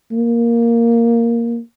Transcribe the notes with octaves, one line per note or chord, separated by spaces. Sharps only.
A#3